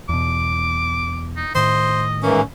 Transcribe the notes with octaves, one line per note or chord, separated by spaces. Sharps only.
E2 B2 D6
D#4
A2 D#3 C5 D#5
G#2 E3 A#3 C#4